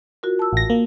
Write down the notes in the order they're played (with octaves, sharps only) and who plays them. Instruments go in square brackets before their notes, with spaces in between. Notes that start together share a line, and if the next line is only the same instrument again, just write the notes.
[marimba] F4 F#4 A#4
A5 E6
[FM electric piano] A1 A#6
A#3